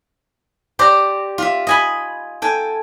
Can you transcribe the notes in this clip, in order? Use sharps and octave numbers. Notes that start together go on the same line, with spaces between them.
G4 C5 D5 A#5
F4 E5
D#5 G#5 B5
A4 G5 G#5